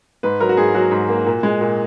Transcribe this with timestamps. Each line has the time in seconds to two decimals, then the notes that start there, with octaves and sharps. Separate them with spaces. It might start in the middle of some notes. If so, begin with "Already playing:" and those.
0.23 G#2 B4
0.40 F#3 A#4
0.49 F#4
0.57 G#2 G#4
0.74 F#3 F#4
0.91 G#2
1.09 A#3
1.26 A#2
1.43 G#3
1.61 A#2